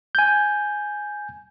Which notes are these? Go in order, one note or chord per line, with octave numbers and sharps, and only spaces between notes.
G#5 G6